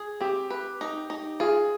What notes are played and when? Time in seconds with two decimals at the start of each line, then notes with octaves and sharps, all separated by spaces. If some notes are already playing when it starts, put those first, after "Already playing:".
Already playing: G#4
0.21 C4 G4
0.50 B4
0.81 D#4
1.10 D#4
1.40 F4 G#4